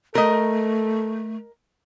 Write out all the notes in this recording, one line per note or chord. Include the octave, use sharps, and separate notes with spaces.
A3 A4 A#4 D#5